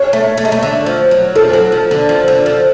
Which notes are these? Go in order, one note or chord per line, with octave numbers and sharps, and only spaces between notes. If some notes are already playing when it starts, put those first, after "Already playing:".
Already playing: C#5
A3
A3
G#3
A3
D3
F3
F#3
F3 A4
F#3
F3
D3
F3
D3
F3